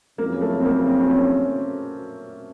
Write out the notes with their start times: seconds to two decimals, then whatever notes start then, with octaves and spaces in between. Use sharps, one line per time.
0.18 F#1 F2 C#3 A#3
0.41 A3
0.60 C4
0.65 A#3
0.87 C4
1.00 C4
1.10 C#4